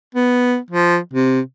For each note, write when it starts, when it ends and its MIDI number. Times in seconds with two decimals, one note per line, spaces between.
0.15 0.56 59
0.70 0.98 53
1.14 1.40 48